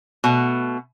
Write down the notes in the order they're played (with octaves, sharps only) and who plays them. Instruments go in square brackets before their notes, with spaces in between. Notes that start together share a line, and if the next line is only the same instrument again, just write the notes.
[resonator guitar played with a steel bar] B2 A3